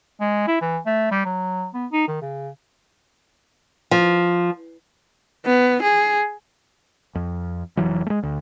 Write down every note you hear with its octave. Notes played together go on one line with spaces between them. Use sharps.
G#3
E4
E3
A3
G3
F#3
B3
D#4
D#3
C#3
F3
B3
G#4
F2
F1 E3 F#3
G#3 A3
D2